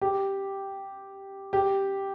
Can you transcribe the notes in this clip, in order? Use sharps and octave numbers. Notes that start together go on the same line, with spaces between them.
G4
G4